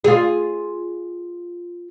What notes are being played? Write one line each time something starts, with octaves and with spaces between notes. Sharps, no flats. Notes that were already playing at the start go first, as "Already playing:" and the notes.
F4 G#4